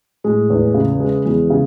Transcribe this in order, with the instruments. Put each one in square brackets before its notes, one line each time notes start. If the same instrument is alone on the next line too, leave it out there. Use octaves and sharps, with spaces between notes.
[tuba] A2 [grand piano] G#3
[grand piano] E2
C#3
G#3
[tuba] E2 [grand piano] G#3
[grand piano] C#3